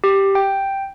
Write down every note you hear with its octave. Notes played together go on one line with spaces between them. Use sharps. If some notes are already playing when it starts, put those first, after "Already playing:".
G4
G5